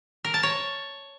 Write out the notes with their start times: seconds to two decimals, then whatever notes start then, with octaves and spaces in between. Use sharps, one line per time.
0.24 A#4
0.34 A5
0.43 C#5